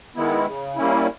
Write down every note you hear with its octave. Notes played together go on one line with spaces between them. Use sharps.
D#3 G#3 B3 E4
C#3
G3 A#3 C#4 E4